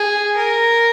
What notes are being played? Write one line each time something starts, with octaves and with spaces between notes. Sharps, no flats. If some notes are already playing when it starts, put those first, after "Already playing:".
Already playing: G#4
A#4